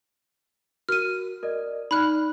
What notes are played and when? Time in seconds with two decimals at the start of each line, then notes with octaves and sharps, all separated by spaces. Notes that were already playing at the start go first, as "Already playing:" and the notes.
0.89 F#4 A#4 F6 D#7
1.43 A#4 D5 D#5
1.91 D#4 D5 B5 F6 F#6